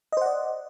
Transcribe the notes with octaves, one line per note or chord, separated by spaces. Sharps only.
C5 D5 D#5 F#5